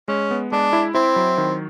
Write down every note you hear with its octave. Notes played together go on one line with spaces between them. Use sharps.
G#3 C#4
B3
G#3 D4
E4
C4 E4
F#3
D#3